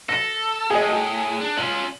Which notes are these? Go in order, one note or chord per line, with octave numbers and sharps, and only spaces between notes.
A4 A#6
A2 G#4 D#5
G#4
D4
C#4 F4 F#7